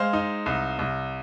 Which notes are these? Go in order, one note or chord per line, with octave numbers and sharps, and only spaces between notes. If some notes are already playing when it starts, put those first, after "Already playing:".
Already playing: G#3 C5 F5
D#4
C2
C2